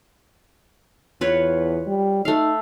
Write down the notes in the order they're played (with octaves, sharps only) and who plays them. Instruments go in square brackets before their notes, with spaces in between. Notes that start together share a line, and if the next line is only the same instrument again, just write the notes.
[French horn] E2 [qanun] F4 B4 C#5
[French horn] G3
[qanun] A3 F5 [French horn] D#4